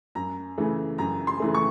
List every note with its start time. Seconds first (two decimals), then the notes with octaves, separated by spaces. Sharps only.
0.15 F#2 A#5
0.58 C#3 E3 A3
0.98 F#2 A#5
1.27 C6
1.40 C#3 E3 A3
1.54 C#6